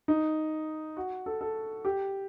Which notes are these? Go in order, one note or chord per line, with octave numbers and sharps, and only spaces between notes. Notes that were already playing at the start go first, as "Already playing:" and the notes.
D#4
F#4
A4
A4
G4